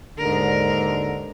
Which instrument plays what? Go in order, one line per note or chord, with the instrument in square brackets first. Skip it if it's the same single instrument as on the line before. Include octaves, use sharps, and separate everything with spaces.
[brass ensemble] D#2 D3 [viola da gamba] G#2 A#4